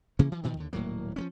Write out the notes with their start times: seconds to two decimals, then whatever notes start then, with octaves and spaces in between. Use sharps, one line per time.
0.19 C3 E3 A#3 C#4
0.32 E3
0.44 A#2 D#3 F3
0.57 D#2 D3
0.73 D#1 A2 F#3 A#3
1.16 F3 G#3 C#4